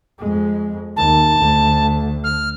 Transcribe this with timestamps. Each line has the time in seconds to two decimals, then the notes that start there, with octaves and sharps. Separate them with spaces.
0.18 F2 G#3
0.97 D#2 A5
1.39 D2
2.24 F6